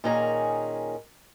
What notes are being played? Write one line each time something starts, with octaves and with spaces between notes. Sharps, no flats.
A#2 D#3 C#4 G#4 A#5